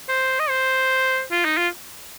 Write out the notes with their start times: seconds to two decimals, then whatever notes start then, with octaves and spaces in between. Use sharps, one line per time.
0.09 C5
0.39 D#5
0.49 C5
1.31 F4
1.45 D#4
1.57 F4